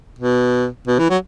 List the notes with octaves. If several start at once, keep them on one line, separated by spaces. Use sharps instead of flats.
B2
B2
E3
F#3